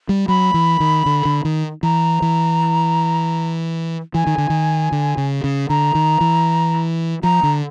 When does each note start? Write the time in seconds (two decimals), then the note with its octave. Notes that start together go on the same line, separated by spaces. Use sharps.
0.09 G3
0.28 F#3 B5
0.54 E3
0.80 D#3
1.06 D3
1.25 D3
1.45 D#3
1.83 E3 A#5
2.22 E3
4.14 E3 G#5
4.27 D#3
4.38 D3
4.50 D#3
4.92 D3
5.17 C#3
5.44 C#3
5.70 D3 A#5
5.95 D#3
6.21 E3
7.24 F3 A#5
7.43 D3